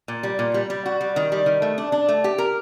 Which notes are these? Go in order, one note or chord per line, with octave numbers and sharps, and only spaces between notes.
A#2
G3
A#2
G3
G3
F#4
G3
D#3
G3
D#3
A3
D4
D4
A3
G4
A#4